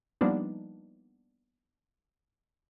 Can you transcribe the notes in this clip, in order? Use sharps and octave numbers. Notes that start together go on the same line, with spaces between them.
F3 G3 A#3 B3 D4 D#4